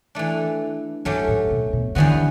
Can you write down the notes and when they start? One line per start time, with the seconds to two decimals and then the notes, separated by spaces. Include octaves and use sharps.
0.15 E3 A3 D4
1.05 G2 F#3 A3 C#4 G4
1.28 A2
1.50 B2
1.73 B2
1.95 G2 D3 E3 G3 B3 F#4